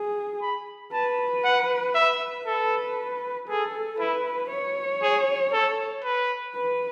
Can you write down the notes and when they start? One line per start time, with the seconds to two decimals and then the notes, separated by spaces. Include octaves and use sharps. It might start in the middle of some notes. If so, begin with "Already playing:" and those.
Already playing: G#4
0.42 B5
0.93 B4 A5
1.44 F#5
1.95 E5
2.46 A4 B4
3.49 G#4 A4
4.00 E4 B4
4.51 C#5
5.03 G#4
5.53 A4
6.04 B4
6.56 B4